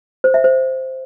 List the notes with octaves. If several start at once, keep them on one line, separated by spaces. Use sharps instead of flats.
C5
E5
C5